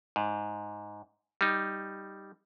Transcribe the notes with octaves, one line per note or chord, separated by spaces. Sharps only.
G#2
G3 D#4